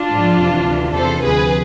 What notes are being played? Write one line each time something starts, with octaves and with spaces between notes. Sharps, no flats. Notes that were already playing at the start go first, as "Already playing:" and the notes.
Already playing: D4 F4
G#2 F3
F2 C3 E3
D2 C3 E3
E2 C3 E3 A4 C5
D2 C3 F3 G#4 B4